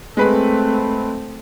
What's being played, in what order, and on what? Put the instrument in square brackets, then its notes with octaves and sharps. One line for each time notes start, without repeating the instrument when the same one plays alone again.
[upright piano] G#3 B4 B5 [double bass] A3 C4